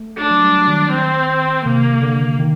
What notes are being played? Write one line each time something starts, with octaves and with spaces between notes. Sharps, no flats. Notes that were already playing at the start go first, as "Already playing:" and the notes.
Already playing: A3
A3 D4
F#3
G3
F#3
D#3
C4
C3 A#3
D3
D#3